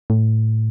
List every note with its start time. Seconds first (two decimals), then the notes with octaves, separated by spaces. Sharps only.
0.10 A2